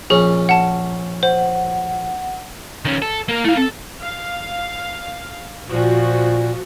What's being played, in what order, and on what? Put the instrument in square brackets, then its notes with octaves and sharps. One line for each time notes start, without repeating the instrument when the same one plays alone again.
[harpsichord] A#1 C#4 [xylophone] G#4
[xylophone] F#5 A5
[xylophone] C5 [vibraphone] F#5
[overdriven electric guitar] D#3 C#4
A4
A#3 A#4
[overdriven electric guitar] A3 F5 [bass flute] E4
[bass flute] C4 [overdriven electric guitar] A4
[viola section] F5
[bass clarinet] A#2 [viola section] F3 F#4